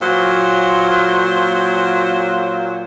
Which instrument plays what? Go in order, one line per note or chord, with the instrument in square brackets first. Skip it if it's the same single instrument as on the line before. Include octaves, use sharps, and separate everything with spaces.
[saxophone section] A#2 F#3 C5